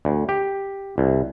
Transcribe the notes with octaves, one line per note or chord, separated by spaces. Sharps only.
D2
G4
C2